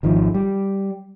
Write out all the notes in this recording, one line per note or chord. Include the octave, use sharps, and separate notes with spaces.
G#1 D#3 F3
G3